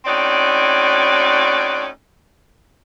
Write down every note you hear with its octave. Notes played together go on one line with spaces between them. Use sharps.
A2 C4 C#4 D#4 F#4 D5